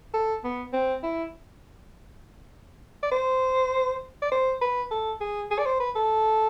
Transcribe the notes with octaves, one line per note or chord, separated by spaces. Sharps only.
A4
B3
C4
E4
D5
C5
D5
C5
B4
A4
G#4
G#4
D5
C5
B4
A4